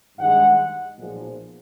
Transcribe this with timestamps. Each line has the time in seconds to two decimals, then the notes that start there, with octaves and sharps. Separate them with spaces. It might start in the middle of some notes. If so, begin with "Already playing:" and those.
0.18 G2 D#3 G#3 F#5
0.98 B1 A#2 F3 G#3